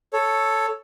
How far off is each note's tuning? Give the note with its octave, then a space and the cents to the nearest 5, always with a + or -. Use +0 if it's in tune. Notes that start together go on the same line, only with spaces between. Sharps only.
A4 +0 C#5 +0